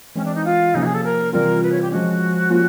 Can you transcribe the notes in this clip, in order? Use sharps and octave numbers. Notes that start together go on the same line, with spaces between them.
E3 G#3 C4 C#4
D4
D#4
F4
C3 F3 A#3 C#4 D#4
G#4
A4
A#4
C3 E3 G3 C4 F4 A#4
B4
C#5
G4
F3 G#3 C#4 F#4
F3 A#3 C#4 F4